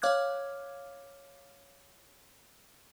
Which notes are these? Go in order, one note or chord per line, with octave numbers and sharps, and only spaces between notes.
C#5 F5 D6 F6 F#6 G#6